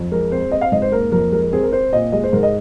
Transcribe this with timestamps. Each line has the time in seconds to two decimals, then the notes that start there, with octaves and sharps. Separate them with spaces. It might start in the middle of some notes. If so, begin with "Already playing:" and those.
Already playing: F2
0.12 G#3 A#4
0.32 C4 C5
0.52 C4 D#5
0.61 F5
0.72 G#2 D#5
0.82 C5
0.92 A#3 A#4
1.12 F2 A#4
1.32 G#3 A#4
1.43 A#4
1.53 C4 G#4
1.63 A#4
1.73 C4 C5
1.93 A#2 D#5
2.12 G#3 D#5
2.23 C5
2.33 G#2 A#4
2.43 D#5